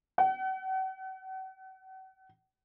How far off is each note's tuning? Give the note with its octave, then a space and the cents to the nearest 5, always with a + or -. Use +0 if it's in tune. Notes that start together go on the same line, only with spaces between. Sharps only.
F#5 +40